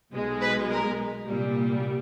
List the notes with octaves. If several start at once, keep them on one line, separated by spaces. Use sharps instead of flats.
B1 B2 G#3
B4
A#4
C2 A#2 G3